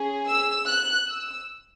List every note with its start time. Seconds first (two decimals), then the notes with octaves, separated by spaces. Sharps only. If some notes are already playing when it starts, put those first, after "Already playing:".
Already playing: C#4 G#4
0.27 E6
0.67 F#6
1.08 E6